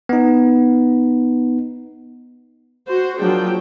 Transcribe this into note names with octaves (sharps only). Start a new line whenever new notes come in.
B3 D#4
F#4 C5
F3 F#3 A#3 D4 G#4 G5